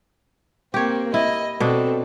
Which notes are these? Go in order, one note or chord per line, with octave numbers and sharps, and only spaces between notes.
A#3 C4 G4 C#5
E4 D#5
B2 C4 D4 A4